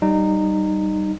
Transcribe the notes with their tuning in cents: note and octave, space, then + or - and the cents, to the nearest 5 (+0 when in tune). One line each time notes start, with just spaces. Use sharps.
G3 -20 D#4 -20